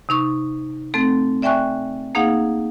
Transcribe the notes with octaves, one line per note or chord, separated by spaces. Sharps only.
C3 D#4 C#6
A3 C4 A4
D5 E5 G5 G#5 C#6 F#6
A#3 D#4 G#4 F5 F#5